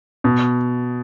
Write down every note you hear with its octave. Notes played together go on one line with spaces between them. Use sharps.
B2